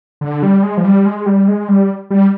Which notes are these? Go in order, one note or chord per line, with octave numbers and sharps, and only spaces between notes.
D3
G3
G#3
F3
G3
G#3
G3
G#3
G3
G3